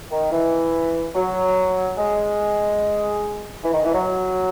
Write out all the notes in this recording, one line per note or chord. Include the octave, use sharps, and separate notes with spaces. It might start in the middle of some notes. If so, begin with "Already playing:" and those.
D#3
E3
F#3
G#3
E3
D#3
E3
F#3